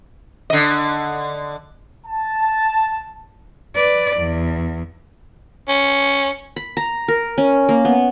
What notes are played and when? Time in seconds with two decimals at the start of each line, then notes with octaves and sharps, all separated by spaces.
0.50 D3 D#5
2.07 A5
3.75 B4 D5
4.17 E2
5.68 C#4
6.56 B5
6.77 A#5
7.08 A#4
7.38 C#4
7.69 A#3
7.85 B3